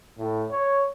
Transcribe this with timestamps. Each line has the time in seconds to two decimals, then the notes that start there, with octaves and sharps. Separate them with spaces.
0.18 A2
0.51 C#5